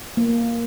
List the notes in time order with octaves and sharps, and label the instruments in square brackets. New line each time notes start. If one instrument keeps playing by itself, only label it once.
[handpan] A#3